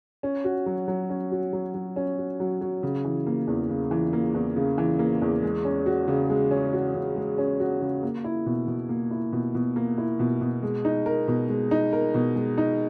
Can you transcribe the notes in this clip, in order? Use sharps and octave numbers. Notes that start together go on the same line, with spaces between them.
C#4
F#4
F#3
F#3
C#4
F#4
F#3
F#3
C#4
F#4
F#3
F#3
C#3
E3
A#3
E2
C#3
E3
A#3
E2
C#3
E3
A#3
E2
G#3
C#4
F#4
C#3
G#3
C#4
F#4
C#3
G#3
C#4
F#4
C#3
A#3
E4
B2
B2
A#3
E4
B2
B2
A#3
E4
B2
B2
G#3
D#4
A#4
B2
G#3
D#4
A#4
B2
G#3
D#4